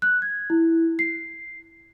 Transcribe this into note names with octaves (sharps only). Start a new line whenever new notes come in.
F#6
G#6
E4
C7